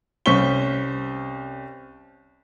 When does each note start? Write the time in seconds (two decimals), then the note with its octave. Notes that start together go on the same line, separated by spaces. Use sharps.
0.26 C2 C#4 C5 C#6 B6 G7